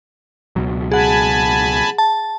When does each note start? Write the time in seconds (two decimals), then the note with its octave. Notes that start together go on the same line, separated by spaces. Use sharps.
0.56 C#2 B2 F#3
0.92 G#4 F#5 G#5 A5 B5
1.98 A5